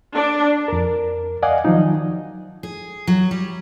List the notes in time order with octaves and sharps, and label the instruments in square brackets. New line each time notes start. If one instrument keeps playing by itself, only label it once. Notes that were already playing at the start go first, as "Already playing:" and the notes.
[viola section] D4
[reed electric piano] F2 A#4
D5 D#5 F5 F#5 G#5
D#3 F3 F#3 D#4
[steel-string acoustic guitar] G#4
F#3
G3